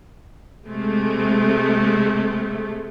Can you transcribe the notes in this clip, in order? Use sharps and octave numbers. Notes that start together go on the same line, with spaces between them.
C3 G#3 A3